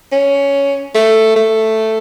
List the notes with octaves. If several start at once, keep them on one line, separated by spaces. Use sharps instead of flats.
C#4
A3
A3